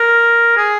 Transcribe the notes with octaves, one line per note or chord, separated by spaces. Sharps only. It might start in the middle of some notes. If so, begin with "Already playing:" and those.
Already playing: A#4
G#4